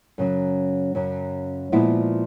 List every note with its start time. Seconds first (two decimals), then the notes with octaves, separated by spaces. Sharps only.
0.18 F#2 C#3 F#3
0.95 F#2 C#3 F#3
1.72 A#2 F3 G#3 B3 E4